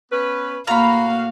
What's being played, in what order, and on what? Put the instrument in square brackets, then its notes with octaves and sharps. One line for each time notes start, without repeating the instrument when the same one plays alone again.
[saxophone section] B3 C#4 B4
[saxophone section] A2 F#4 F5 [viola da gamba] A#3 [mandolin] A#5 B5